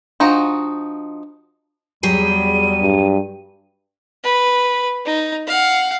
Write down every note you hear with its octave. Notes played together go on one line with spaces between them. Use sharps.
F3 D4 D#4 F#4
E2 F#3 G3 G4 G#4 D#7
G2
B4
D#4
F5 F#5